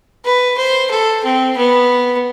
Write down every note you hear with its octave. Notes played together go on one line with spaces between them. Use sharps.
B4
C5
A4
C4
B3